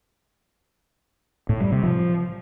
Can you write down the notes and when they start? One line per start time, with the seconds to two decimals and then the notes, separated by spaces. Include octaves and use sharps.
1.49 A2
1.61 G3
1.72 C3
1.83 F3